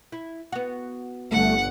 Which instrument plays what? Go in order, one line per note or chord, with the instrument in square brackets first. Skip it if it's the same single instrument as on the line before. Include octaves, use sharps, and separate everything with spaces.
[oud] E4
B3 F#4
[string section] G1 [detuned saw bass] A3 [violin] F#5